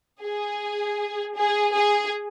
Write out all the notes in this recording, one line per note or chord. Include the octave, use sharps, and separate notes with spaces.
G#4
G#4
G#4